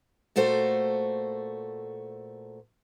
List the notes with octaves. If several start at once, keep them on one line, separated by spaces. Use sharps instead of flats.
A#2 A3 F#4 A4 C5